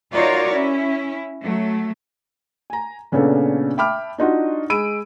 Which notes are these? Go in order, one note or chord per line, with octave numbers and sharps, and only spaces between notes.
D#4 F4 F#4 A#4 C#5 D5
C#4 E4
F#3 A3
G#5 A#5
A#2 C#3 B3 C#4 D4 A4
E5 G5 A5 B5 D6 F6
D4 D#4 F4 F#4
G#3 B5 E6 D7 D#7